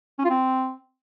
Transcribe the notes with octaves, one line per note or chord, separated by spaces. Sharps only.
C#4
F4
C4